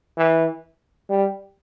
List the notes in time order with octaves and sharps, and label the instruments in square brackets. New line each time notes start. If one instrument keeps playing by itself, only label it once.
[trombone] E3
G3